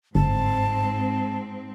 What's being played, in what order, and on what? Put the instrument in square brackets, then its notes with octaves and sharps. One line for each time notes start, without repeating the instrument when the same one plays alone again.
[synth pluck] G1 [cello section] G#2 C4 [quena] A5